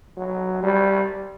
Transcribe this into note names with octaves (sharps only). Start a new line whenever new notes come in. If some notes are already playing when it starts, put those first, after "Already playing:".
F#3
G3